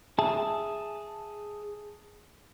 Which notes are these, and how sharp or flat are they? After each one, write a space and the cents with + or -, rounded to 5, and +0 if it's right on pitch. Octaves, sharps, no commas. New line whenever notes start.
G#4 +0 E5 +0 A5 +5